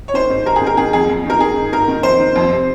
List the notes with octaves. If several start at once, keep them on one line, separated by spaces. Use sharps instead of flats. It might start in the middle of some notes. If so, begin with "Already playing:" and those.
C#5
D#3 C5
G#2
G#2 A#4
G#4
D#3
A#4
D#3 G#4
F2 G#4
F2
D#3 A#4
D#3 G#4
G#2
G#2 A#4
D#3
F2 C5
D#3
F2
C3